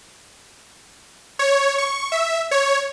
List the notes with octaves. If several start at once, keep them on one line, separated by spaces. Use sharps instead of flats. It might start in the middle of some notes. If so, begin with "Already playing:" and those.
C#5
C#6
E5
C#5